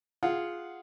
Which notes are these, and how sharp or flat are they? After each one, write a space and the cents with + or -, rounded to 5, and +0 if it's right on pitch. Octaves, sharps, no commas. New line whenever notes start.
F4 +0 G#4 +0 F#5 +0